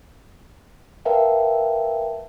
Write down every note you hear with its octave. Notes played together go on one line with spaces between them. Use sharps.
A#4 B4 E5 F5 G5 A5